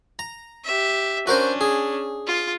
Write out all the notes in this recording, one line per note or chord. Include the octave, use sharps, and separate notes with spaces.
A#5
G4 E5
C#4 D4 F#4 A#4 C5
G#4
F4